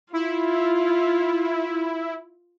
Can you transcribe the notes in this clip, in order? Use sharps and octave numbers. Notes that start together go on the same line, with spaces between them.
E4 F4